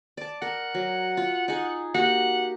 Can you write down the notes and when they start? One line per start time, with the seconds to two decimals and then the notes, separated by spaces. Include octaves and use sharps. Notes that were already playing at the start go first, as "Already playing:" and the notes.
0.17 D5 A5
0.42 A#4 F#5
0.74 F#3
1.17 F4
1.48 D#4 G#4
1.94 A#3 F#4 G4 F#5